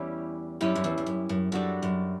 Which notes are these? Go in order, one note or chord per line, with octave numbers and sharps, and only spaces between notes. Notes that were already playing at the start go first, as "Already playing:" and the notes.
Already playing: E2 G3 C#4 E4 G4
F#2 G3 C#4 E4 G4
F#2
E2
E2
F#2
F#2
F#2 G3 D4 F#4 A4
F#2